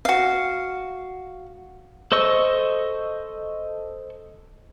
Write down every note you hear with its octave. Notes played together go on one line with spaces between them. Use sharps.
F#4 F5
A4 C5 D#5 C#6 E6